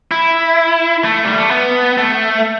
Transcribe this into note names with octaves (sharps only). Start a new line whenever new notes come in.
E4
A3
G3
A3
B3
A3